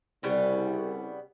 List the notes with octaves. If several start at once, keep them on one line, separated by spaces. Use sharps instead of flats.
C2 C#3 G3 B3